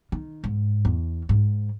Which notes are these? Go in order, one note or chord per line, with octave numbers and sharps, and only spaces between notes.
D#3
G#2
E2
G#2